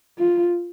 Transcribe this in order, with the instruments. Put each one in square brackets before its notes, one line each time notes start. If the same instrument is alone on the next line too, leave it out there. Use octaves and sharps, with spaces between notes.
[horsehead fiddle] F4